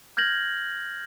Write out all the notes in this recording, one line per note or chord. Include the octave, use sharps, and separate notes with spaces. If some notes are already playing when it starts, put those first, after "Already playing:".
F6 G6 G#6 A#6 F#7